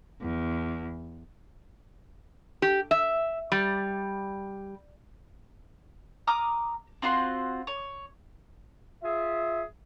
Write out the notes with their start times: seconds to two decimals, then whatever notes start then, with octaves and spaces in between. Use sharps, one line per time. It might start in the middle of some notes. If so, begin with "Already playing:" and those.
0.22 E2
2.62 G4
2.91 E5
3.52 G3
6.27 A#5 D6 D#6 F6
7.02 C4 F4 F#4 C6
7.67 C#5
9.02 F4 G#4 E5